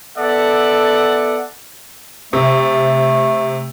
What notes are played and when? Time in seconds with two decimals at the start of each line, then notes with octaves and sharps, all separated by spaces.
0.17 B3 A4 D5 E5 F#5
2.33 C3 A3